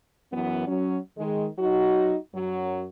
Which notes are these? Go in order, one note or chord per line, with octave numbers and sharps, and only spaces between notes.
F#2 E3 B3
F#3 C#4
D#3 G#3
F#3 D#4 F#4
F#2 F#3